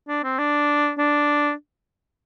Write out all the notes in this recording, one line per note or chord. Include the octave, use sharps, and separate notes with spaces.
D4
C4
D4
D4